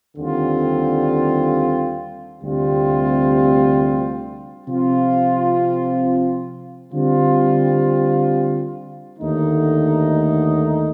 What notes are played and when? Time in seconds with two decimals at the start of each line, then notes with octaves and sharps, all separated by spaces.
0.16 D#2 D3 G3 C4 F4
2.41 D2 C3 G3 C4 F4
4.67 C3 F3 C4 F4
6.92 D3 G3 C4 F4
9.18 D#2 D3 A3 D#4